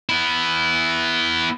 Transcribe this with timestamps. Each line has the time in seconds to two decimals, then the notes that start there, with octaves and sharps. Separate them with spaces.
0.09 B3 E4